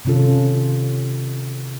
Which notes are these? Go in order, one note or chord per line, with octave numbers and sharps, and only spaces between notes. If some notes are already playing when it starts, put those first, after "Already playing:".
C3 D#3 C#4 F4 A4